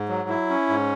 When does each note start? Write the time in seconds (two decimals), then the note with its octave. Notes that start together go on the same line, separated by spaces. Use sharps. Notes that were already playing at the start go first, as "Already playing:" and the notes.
Already playing: G#2
0.09 F#3
0.29 E4
0.50 C#4
0.69 G#2